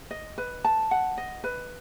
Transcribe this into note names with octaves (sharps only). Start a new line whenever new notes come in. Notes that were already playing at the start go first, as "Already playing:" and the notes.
D#5
B4
A5
F#5
D#5
B4